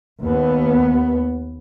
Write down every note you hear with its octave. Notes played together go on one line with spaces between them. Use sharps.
D#2 B3